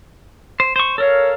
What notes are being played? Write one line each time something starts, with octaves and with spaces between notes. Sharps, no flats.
C5
C5 C#6
A4 A#4 C#5 F5